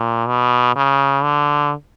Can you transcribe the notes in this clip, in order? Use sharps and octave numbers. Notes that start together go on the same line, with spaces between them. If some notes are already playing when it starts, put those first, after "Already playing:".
Already playing: A#2
B2
C#3
D3